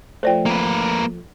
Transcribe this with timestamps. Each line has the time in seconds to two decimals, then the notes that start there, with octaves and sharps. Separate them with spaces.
0.23 F3 A3 C5 D5 G5
0.46 A#3 B4